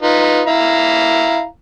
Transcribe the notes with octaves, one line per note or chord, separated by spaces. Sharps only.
D#4 F4 B4
E4 F5 A#5